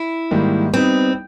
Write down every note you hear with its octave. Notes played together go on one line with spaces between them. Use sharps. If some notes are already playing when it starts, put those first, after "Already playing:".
Already playing: E4
G#2 D#3 G3 A#3
G3 B3 C4 D#4